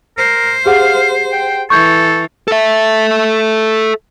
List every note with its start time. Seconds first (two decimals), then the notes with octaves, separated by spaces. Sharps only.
0.18 A#4 C5
0.66 G4 G#4 F5 F#5
1.32 G5
1.70 E3 A4 C#6 G6 G#6
2.48 A4 E5